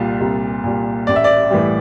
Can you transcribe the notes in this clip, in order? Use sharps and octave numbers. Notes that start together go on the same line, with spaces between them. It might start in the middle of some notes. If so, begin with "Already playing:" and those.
Already playing: C2 A#2 G3 F4
C2
A#2 G3
A1 D5
E5
D5
A2 E3 G3